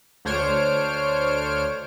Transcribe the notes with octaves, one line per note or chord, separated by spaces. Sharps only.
D2 D4 C5 C#5 F6 D7